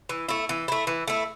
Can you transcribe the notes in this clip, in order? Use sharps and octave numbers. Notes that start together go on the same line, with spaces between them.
E3
A3 E4
E3
A3 E4
E3
A3 E4